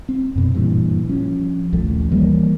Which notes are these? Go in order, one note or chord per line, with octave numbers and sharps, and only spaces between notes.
C4
F#2 B2
G2 A#2 E3
F3 C#4
A#1 D#2 F3 A3
E3 G3 A#3